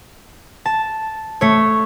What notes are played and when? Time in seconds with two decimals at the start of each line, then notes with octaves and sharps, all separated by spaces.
0.65 A5
1.41 A3 C#5